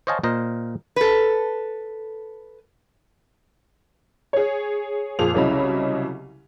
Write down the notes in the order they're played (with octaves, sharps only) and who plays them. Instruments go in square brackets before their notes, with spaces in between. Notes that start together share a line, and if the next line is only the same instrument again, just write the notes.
[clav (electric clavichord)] C5 C#5 D#5 F5 G#5 A5
A#2 A#4 C5 D#5
[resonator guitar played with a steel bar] A4 B4
[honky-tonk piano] G#4 C#5
F2 A#2 G#4 F7
C2 C#3 F#3 E4 D#5 B5